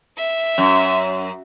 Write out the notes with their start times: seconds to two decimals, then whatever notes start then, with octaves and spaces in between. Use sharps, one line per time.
0.17 E5
0.58 F#2